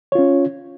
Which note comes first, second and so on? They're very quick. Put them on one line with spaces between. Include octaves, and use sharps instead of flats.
C#5 F4 C#4